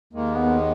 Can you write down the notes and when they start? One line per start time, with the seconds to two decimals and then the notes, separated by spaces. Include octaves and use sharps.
0.13 D#2 D#3 G#3 A#3
0.37 B3